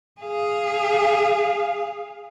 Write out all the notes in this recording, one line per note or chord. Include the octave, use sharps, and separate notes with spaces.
G#4 F5